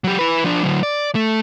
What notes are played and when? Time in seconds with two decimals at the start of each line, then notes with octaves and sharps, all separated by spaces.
0.04 F#3 G4
0.19 E4 B4
0.44 F3 D4
0.63 D3 F#3
0.83 D5
1.15 A3